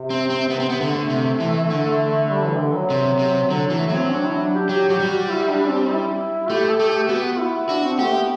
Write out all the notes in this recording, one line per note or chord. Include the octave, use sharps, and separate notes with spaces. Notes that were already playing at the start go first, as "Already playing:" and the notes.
Already playing: C3
C4
C4
C3 B3
C4
C3 B3
D3
A3
C3
E3
D3
G3
E3
D3
F#3
C3
C3
D3 F#3
F#3
E3
A3
F#3
C4
D4
E4
D4
G4
F#3 G4
F#3 G4
G3
F#4
E4
D4
C4
E4
A3 G4
A4
A3
G4
B3 F#4
E4
D4 F#4
C4
A3 G4
B3